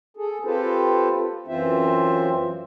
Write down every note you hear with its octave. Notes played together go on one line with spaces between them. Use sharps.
G#4 A4
C4 F4 G4 A4 B4 C5
F#2 E3 C4 F4 C5 E5